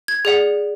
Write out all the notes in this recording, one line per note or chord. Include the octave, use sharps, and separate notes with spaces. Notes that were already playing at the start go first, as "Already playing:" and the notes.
G#6
G#4 D5 F#5